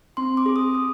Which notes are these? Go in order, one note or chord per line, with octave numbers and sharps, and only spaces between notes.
C4 C6
D6
G#4
D#6
G#4 D#6